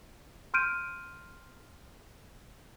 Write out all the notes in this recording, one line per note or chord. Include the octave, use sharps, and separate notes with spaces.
C6 F6 G6 D7 D#7